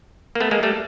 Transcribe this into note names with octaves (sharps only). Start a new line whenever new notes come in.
A#3
A3 B3
G#3 A#3
G3 A3